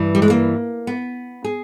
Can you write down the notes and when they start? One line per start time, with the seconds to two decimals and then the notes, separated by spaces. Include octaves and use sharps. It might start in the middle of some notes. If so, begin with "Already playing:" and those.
Already playing: G2 E3
0.15 G3
0.22 G#3
0.30 A#3
0.87 B3
1.44 G#4